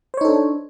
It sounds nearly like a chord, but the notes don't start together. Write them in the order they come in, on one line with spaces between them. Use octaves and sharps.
C5 C#5 D#4 A4 D4